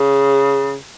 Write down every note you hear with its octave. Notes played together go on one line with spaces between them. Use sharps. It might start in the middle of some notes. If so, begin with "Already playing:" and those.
Already playing: C#3